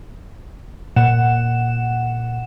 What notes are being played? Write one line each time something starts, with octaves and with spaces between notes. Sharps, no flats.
A#2 F#5 E7